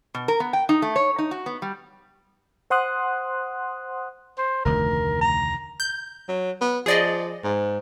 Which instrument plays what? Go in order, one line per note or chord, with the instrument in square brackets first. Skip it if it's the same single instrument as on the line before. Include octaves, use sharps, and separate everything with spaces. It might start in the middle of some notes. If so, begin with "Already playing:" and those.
[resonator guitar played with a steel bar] B2
A#4
B3
G5
D#4
A3
C#5
D#4
F#4
B3
G3
[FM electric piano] C5 F#5 C6 D#6 F#6
[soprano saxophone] C5
[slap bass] F1 D2 D#3 [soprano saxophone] A#4
[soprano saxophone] A#5
[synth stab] G6
[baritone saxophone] F#3
B3
[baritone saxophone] F3 [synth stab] G#4 D5 D#5
[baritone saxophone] G#2